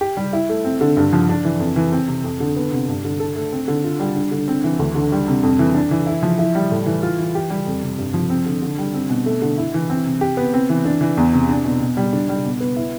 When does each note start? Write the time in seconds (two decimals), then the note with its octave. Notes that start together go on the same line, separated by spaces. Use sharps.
0.01 G4
0.17 G3
0.33 E4
0.49 A3
0.64 C4
0.81 D3
0.97 G2
1.13 F3
1.29 D4
1.45 E3
1.60 F2
1.76 E3
1.92 C4
2.08 C3
2.24 F2
2.40 D3
2.56 B3
2.72 C3
2.88 G2
3.05 D3
3.20 A4
3.36 A3
3.52 C4
3.68 D3
3.84 F4
4.00 G3
4.16 D4
4.31 D3
4.48 C4
4.64 E3
4.79 D2
4.95 D3
5.12 G3
5.28 C3
5.43 F2
5.59 E3
5.75 D4
5.91 E3
6.07 E4
6.23 F3
6.39 E4
6.55 G3
6.71 A2
6.86 E3
7.03 F4
7.19 E3
7.35 G4
7.50 G3
7.67 F2
7.83 C3
7.98 G2
8.14 F3
8.30 C4
8.46 D3
8.62 D3
8.78 G3
8.94 C4
9.10 B2
9.26 A3
9.42 D3
9.58 E4
9.74 E3
9.90 C4
10.05 C3
10.21 G4
10.37 B3
10.54 C4
10.70 E3
10.85 D4
11.01 E3
11.17 E2
11.33 C3
11.49 D4
11.65 B2
11.81 B2
11.97 G3
12.13 D4
12.29 G3
12.45 B2
12.61 B3
12.76 E4